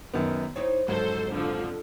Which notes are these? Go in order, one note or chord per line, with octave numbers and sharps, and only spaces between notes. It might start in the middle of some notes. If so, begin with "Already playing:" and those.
F#2 D#3 B3
C4 D#4 E4 C#5
F2 G#2 C#3 F#3 A4 C5
D3 F3